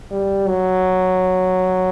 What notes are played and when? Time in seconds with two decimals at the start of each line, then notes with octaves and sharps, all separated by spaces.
0.11 G3
0.47 F#3